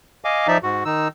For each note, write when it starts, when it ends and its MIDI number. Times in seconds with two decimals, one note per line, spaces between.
0.25 0.47 75
0.25 0.47 77
0.25 0.47 80
0.25 0.47 86
0.48 0.58 53
0.48 0.58 63
0.48 0.58 74
0.48 0.58 76
0.63 0.84 44
0.63 0.84 66
0.85 1.08 51
0.85 1.08 63
0.85 1.08 88